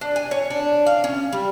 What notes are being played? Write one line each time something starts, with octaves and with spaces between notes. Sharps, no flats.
D4
G#5
C#5
D4
F5
C#4
G3